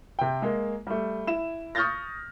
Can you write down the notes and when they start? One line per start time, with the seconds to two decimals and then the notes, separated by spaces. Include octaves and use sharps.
0.19 C3 G5
0.42 G#3 A#3
0.87 G3 A3
1.27 E4 E7
1.75 C#6 D#6 F6 G6 A6 A#6